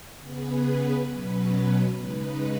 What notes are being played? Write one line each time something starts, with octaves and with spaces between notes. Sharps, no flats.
C#3 B3 G#4 B4
B2 F#3 C#4 B4
C#3 G#3 D#4 B4